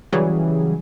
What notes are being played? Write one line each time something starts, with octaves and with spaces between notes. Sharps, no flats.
C#3 E3 F#3 G3 G#4